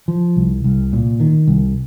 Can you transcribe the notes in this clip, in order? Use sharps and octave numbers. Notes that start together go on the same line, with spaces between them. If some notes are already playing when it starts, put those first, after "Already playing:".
F3
C2
C2
A#2
D#3
C2